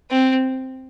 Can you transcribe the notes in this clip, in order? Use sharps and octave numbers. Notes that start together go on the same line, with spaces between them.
C4